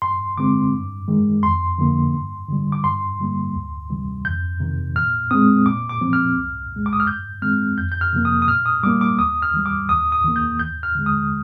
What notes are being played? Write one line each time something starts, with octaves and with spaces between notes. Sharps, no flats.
G2 C6
D3 G#3 C4 D6
G2
D#3 G#3
F2 C6
D3 F3 A#3
G2
D3 G3
D6
G2 C6
D3 G3 A#3
D2
C3 D#3 G3
F2 G6
C3 D#3
A#2 F6
G#3 C4 D#6
A#2 D6
D6
F3 C4
F6
C2
A#2 G#3
D6
D#6
F6
G2 G6
D#3 G#3 C4 F6
F2 G6
G6
F6
C3 F3 A#3
D#6
D#6
A#2 F6
D#6
G3 A#3 D6
D6
D#2 D#6
F6
D#3 G3
D6
D#2 D#6
D#6
D#3 A#3
G6
D#2 G6
F6
D3 G#3
D#6